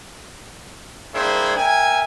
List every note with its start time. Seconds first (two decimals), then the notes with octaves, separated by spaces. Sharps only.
1.14 G3 A#3 D4 E4 G#4 C5
1.57 A#4 E5 G5 G#5